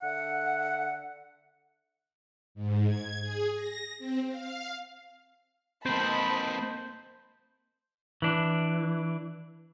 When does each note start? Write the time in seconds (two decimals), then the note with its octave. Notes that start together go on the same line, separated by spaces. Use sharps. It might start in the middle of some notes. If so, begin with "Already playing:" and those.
0.02 D3 E5 F#5
2.55 G#2
2.87 G#6
3.21 G#4
3.54 A#6
3.99 C4
4.29 F5
5.86 A#3 C4 C5 D#5 A5 B5
8.22 E3 D4